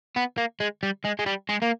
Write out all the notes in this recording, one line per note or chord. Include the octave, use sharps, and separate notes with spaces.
B3
A#3
G#3
G3
G#3
G#3
G3
G#3
A#3